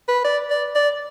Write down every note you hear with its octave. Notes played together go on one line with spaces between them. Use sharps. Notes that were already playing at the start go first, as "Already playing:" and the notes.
B4
D5
D5
D5